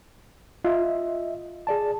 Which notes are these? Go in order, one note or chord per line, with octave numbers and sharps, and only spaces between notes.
F4 D#5 E5
G#4 D5 A5